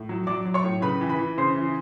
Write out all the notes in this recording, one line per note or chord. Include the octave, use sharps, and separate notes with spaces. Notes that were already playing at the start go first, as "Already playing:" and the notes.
Already playing: A2
F#3
F#3 D5 D6
F#3
C#5 C#6
A2
C#3 B4 B5
E3
B4 B5
E3
C#3 C5 C6
E3